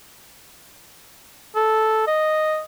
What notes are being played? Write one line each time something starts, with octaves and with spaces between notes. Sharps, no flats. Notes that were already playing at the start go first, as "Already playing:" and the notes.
A4
D#5